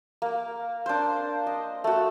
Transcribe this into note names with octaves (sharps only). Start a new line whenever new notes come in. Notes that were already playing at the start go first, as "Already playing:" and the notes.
A#3
D4 C5
D#5
A3 F#4